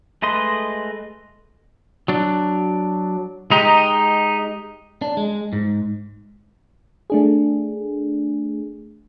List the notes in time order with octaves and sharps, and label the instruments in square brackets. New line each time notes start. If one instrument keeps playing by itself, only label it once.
[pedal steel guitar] G#3 A3 B4 D#5 C6
[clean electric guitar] F#3 D4
[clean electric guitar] G#3 G4 [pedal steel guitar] D#4 A#5
[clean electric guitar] D4
G#3
G#2
[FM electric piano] A3 D4 G#4